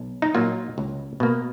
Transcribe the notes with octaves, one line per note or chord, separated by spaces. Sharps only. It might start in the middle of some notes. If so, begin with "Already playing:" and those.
Already playing: B1
D#4
A#2 F#3 A#3 F4
C#2
B2 A#3